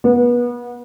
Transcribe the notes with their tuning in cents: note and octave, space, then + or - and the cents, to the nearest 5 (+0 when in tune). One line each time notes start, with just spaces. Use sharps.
B3 -30